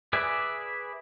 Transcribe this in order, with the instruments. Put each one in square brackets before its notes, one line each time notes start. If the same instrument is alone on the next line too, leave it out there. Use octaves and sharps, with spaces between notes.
[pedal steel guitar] G#4 B4 D5 E5 G#5